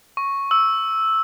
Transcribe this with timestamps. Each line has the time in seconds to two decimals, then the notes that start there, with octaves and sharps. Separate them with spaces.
0.17 C#6
0.51 E6